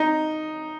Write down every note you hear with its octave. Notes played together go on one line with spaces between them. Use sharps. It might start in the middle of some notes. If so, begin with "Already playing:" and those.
Already playing: D#4